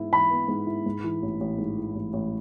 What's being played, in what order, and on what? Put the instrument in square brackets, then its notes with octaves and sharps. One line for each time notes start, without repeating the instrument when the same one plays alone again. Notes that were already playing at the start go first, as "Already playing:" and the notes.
Already playing: [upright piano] G#2 E3 B3 E4
[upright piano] E3 [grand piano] B5
[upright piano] B3
G#2
E4
G#2
E3
A1
A1
G#2
E3
A1
A1